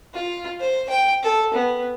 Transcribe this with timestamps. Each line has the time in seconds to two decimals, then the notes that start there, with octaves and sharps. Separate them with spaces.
0.14 F4
0.60 C5
0.89 G5
1.23 A4
1.54 B3